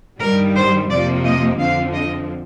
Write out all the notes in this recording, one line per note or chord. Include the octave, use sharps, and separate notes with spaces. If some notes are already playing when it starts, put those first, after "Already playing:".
G2 D#3 G3 A#4
C5
F2 C3 F3 A#3 D5
D#5
F2 D3 F3 C4 F5
D#5